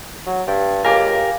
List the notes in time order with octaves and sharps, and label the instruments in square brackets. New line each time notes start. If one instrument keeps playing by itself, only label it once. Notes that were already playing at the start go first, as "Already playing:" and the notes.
[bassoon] F#3
[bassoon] G2 [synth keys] G5
[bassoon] C#2 [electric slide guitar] G4 A#4 [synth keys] F5 G#5 D6